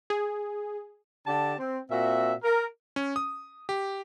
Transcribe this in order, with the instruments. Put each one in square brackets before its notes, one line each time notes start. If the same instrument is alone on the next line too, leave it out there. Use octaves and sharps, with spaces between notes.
[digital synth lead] G#4
[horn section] D3 D4 G4 A5
C4
A#2 C4 F#4 E5
A#4
[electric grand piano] C#4
D#6
G4